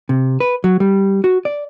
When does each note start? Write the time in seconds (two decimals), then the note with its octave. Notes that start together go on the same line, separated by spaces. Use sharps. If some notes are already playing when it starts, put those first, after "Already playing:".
0.09 C3
0.40 B4
0.64 F#3
0.80 G3
1.24 F#4
1.45 D5